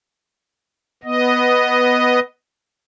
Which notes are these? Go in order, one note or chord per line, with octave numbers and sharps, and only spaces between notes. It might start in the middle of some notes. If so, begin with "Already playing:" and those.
B3 D#5